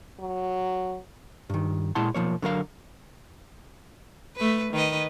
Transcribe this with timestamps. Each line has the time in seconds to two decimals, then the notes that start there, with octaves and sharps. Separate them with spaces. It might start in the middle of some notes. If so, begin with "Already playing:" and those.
0.20 F#3
1.50 G2 D#3
1.95 A#2 G#3 E4 F#5 A5 C6
2.15 B1 F3 A#3 C#5
2.42 D3 F#3 A#4 F5
4.36 A3 B4
4.73 D#3 B4 D#5